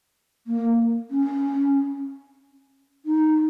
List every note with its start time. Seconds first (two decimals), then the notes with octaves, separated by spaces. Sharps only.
0.47 A#3
1.11 C#4
3.06 D#4